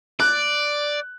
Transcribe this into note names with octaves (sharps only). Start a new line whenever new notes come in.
D5 F#6